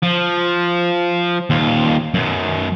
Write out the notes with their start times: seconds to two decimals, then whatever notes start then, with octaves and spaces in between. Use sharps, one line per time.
0.03 F3
1.50 D#2 F4
2.14 F#2 B2